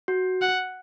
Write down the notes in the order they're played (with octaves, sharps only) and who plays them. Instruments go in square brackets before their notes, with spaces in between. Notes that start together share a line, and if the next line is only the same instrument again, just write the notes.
[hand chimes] F#4
[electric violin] F#5